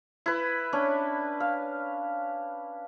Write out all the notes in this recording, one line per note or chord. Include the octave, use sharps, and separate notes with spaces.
E4 B4
C#4 D4
F5